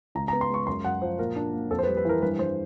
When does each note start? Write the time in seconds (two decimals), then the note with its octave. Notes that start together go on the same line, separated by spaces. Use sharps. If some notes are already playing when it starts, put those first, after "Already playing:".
0.15 C#2 A#5
0.28 A#5
0.33 B3
0.41 C6
0.50 G#3 C#6
0.67 F#2 C6
0.84 F#2 F#5
1.02 F3 C5
1.19 A#2 A#4
1.36 D4
1.53 A#3
1.70 F2 A4
1.79 C5
1.83 B4
1.88 G3
1.97 B4
2.05 E3 A#4
2.22 G2 B4
2.39 G2 C5